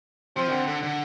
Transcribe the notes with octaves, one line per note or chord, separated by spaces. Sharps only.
F3 C4
D#3
D3
D3
D3